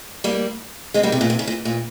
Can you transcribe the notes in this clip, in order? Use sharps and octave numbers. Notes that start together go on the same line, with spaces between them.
G3 A#3
G#3 C4
G3 A#3
C3
A#2
C3
C#3
A#2
A#2